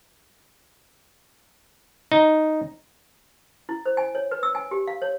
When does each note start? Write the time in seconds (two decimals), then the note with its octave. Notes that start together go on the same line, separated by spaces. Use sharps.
2.12 D#4
3.69 E4
3.86 C5
3.97 G#5
4.15 C#5
4.31 B4
4.43 E6
4.55 G#5
4.71 G4
4.87 F5
5.02 C#5